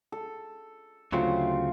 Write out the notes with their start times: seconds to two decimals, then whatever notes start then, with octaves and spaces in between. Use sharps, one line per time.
0.12 A4
1.12 D2 C#3 F#3 A3 C4 F4